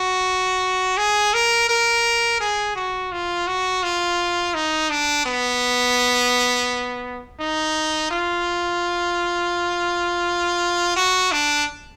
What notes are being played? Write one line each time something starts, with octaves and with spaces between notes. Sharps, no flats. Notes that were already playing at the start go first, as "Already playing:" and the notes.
Already playing: F#4
G#4
A#4
A#4
G#4
F#4
F4
F#4
F4
D#4
D4
B3
D#4
F4
F#4
D4